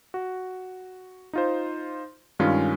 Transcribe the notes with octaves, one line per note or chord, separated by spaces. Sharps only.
F#4
D#4 F4 C5
G2 D#3 G#3 C#4 F4